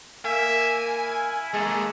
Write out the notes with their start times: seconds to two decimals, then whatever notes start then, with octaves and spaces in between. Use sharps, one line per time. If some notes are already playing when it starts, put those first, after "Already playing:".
0.25 A#3 E5 G#5
0.86 E4
1.54 G#3 A#3 G#4 A4